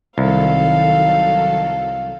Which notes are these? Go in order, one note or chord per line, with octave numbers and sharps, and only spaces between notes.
C2 D#3 F#3 A4 F5